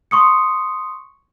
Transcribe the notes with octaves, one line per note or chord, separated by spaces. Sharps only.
C6 C#6 D#6 C#7